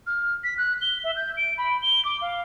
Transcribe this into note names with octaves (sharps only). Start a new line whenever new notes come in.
F6
B6
F#6
G7
E5
G6
D7
B5
G7
D6
F5